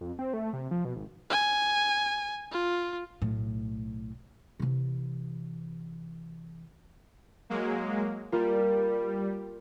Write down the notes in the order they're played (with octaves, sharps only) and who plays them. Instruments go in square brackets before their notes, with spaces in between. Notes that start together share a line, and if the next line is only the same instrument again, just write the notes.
[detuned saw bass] F2
C4
A3
C3
F3
B2
G#1
[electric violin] G#5
F4
[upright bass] B1 A2
C3 E3
[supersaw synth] F#3 G#3 A#3
[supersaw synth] G3 [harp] A#3 F4